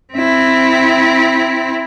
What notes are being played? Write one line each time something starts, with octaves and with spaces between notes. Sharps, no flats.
C4 E4